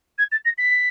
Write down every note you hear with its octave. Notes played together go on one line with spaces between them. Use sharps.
G#6
A6
A#6
B6